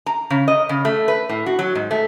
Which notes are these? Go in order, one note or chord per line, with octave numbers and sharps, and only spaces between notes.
A#5
C#3
D#5
C#3
A3
B4
A2
F#4
F#3
G#2
A3